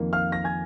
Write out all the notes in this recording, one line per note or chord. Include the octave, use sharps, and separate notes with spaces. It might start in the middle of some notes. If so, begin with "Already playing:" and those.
Already playing: F2 D#3 A#3
F5 F6
A#6
G#5 G#6